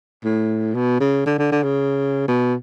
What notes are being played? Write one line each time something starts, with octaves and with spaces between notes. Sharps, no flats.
A2
B2
C#3
D3
D3
D3
C#3
B2